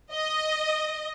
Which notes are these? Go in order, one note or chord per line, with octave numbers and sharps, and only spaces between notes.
D#5